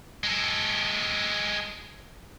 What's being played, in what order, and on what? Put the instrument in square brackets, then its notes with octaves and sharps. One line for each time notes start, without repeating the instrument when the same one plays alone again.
[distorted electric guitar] G#3 A4